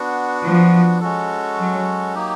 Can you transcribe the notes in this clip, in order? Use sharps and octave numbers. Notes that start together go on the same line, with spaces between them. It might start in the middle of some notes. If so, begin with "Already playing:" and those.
Already playing: B3 D4 F#4
F3
G#3 C#4 F#4 A4
F#3
F#3 A#3 D#4 G4